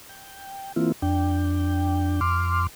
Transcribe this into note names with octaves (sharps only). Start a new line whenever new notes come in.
G5
E3 A#3 C4 E4 F4
F2 D4 G5
F2 C6 D6 F6